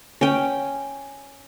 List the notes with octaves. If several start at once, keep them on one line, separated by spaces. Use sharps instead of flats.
C#4 G5